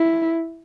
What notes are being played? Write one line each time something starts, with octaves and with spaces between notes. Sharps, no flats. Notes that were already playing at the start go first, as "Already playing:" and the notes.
Already playing: E4